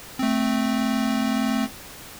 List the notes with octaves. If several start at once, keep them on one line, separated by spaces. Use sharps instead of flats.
A3 C4